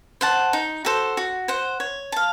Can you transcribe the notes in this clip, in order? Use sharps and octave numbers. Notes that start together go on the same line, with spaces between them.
C5 F#5 A5
D#4
F#4 A4 C5
F#4
C5 F#5
C#5
F5 A5